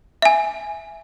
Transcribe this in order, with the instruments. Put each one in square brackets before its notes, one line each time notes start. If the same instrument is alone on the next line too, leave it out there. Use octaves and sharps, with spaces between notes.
[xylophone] E5 G#5